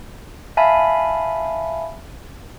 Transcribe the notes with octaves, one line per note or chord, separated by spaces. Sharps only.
E5 F5 G#5 A5 B5